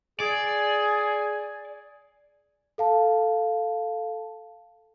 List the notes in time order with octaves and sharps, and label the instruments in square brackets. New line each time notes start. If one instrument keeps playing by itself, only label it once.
[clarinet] G#4 [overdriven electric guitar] D5 [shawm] G#5
[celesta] A4 F5 A5